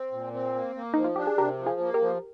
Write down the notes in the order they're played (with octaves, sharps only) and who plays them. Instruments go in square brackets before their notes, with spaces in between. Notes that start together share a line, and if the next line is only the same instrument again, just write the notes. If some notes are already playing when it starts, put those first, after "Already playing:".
Already playing: [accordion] C4
A#2
C4
A#3
A#3
[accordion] F3 [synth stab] D#4
[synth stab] F4
[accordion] D4 [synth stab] G4
[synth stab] G#4
[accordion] C3 [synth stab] G4 A#4
[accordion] F3
[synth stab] F4 G#4
[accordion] A#3
[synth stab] G4 A#4
[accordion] F3